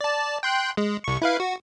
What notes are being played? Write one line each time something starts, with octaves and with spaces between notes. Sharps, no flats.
D5 A5
G5 C6 F#6
G#3
C2 C#6
E4 B4 F5
F#4